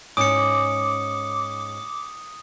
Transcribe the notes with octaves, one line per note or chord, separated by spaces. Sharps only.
G#2 C#4 D6 D#6 C#7